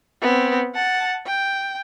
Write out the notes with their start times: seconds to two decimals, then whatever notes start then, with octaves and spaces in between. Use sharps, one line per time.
0.22 B3 C4
0.75 F#5 A5
1.27 G5